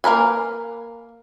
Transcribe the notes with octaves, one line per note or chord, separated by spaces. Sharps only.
A#3 A#4 B4 G#5